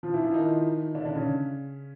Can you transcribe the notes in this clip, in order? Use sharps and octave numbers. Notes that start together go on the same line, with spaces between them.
F3 F4
E3 E4
F3 F4
D#3 D#4
D3 D4
D3 D4
C#3 C#4